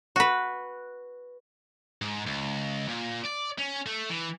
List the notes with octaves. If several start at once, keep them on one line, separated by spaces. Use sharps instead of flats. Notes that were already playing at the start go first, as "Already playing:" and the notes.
F#4 B4
G#2
C#2
A#2
D5
C#4
A3
E3